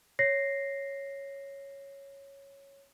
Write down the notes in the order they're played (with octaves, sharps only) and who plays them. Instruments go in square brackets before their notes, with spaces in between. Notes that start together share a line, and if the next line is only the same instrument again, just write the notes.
[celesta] C#5 A#6 C7